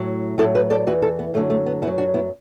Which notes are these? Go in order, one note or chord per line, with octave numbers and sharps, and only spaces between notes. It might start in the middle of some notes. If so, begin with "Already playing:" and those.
Already playing: A2 F#3
A2 F#3 E4 A4
F#4 B4
A4 D5
E2 E3 F#4 B4
E4 A4
B3
F#2 D3 F#3 A3
A3
B3
F#2 B3 E4
F#3
D4 F#4
B3 E4